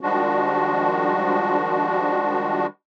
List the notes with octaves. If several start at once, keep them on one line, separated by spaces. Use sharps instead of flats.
D#3 F3 G3 G#3 D4 F#4